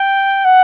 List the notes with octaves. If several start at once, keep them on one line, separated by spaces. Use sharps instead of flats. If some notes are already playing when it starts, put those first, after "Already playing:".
Already playing: G5
F#5